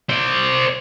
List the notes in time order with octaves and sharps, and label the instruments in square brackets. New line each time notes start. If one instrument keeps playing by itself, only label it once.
[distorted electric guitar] C5 D5